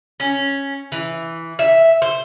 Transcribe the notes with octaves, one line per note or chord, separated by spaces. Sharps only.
C#4
E3
E5
C5